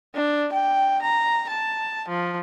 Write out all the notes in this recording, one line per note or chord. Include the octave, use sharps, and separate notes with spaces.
D4
G5
A#5
A5
F3